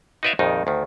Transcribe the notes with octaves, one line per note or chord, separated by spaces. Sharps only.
D#4 F#4 B4 D5 E5 F5
A#1 F2 D#3 D#4
D2 D#3